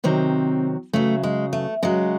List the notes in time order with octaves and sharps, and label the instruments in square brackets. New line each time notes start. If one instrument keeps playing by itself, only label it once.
[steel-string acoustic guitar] C3 D#3 F#3 C4
C#3 F#3 A3
G#3
A3
C#3 F#3 G#3